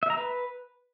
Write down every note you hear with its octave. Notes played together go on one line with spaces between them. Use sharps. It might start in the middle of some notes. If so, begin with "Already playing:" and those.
E5
A#5
B4